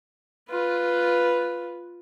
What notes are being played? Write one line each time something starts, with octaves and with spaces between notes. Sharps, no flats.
F4 B4